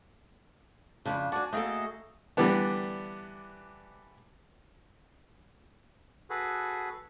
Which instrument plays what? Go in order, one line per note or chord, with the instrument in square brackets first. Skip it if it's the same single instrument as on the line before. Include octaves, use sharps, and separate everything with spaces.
[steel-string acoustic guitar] F2 A2 C#3 [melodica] D4
[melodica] D4 F#4 D5 [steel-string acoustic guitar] F#5 G#5
[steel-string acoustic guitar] A3 A#3 A4 [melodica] F#4 G#4 D#5
[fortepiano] D3 E3 G3 A3 B3 D4
[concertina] F#4 G#4 A4 B4